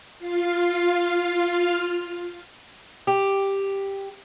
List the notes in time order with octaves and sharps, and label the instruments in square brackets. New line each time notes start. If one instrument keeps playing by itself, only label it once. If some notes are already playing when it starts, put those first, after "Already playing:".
[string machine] F4 F5
[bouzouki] G4